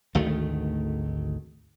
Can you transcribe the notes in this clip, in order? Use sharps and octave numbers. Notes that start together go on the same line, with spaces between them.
G#1 D2 D#3 A3